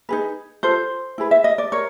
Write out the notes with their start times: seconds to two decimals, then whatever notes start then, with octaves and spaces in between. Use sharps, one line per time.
0.09 D#4 G#4 B4
0.63 F4 A4 C5
1.18 E4 G#4 B4
1.31 E5
1.44 D#5
1.58 D5
1.72 A#4 C#5